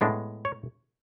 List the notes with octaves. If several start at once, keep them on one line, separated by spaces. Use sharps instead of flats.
A2 G#3 B3 D4
C#5